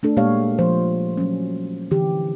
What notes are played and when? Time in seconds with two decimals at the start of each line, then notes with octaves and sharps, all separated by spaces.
0.03 A3 D4 A4
0.17 A#2 G#3 A#3 G4 C#5 F5
0.59 F3 C5
1.17 F#3 C#4
1.91 D3 E3 G4